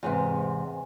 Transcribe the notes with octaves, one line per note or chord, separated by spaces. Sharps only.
E2 G#2 C3